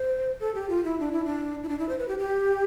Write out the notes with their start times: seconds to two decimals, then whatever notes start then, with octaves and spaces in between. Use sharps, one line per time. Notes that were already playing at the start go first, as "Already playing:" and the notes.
Already playing: C5
0.40 A4
0.55 G4
0.70 F4
0.85 E4
1.00 D4
1.12 E4
1.25 D4
1.63 E4
1.69 D4
1.79 E4
1.89 C5
1.99 B4
2.08 G4
2.18 G4